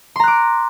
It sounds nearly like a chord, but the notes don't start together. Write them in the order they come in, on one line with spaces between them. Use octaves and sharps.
C6 A#5 F#6 D6